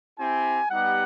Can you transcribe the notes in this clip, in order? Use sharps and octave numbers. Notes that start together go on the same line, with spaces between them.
C4 E4 G4 G#5
G3 B3 D#4 G4 F#5